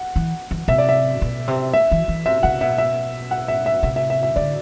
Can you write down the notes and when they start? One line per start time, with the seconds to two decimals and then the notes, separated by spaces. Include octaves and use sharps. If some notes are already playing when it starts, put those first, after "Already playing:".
Already playing: F#5
0.16 E3
0.51 E3
0.68 C3 E5
0.78 D5
0.89 E5
1.22 B2
1.48 C3
1.73 E5
1.91 E3
2.08 E3
2.26 C3 E5
2.43 C3 F#5
2.61 B2 E5
2.78 E5
3.31 F#5
3.48 E5
3.66 E5
3.83 C3 E5
3.96 E5
4.10 E5
4.23 E5
4.36 D3 D5